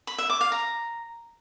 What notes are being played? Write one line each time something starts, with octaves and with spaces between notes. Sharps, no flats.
B5
E5
D6
F5
A#5